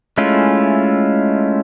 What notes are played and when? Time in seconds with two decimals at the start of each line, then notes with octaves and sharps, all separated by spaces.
0.18 G#3 A3 C#4 E4 F4